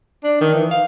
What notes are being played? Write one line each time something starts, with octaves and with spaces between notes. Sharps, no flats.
D4
D#3
E3
F5